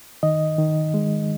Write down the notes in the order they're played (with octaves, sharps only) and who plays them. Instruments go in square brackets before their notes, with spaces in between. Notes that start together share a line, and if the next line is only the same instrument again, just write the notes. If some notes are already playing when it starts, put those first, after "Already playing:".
[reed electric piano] D#3 D#5
D#3
G#3